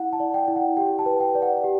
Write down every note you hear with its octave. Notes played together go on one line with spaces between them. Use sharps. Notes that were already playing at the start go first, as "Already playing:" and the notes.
Already playing: E4 F#5
A5
D5
G5
E4
F#5
G4 G5
A5
B4
G5
D5
F#5
G4